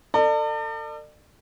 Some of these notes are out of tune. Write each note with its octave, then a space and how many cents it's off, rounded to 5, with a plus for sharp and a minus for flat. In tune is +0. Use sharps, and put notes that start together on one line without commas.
A4 +40 D5 +40